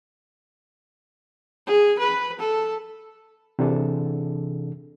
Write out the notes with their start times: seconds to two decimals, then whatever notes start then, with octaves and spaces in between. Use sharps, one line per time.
1.66 G#4
1.99 B4
2.39 A4
3.59 C3 E3 D4 G#4 A4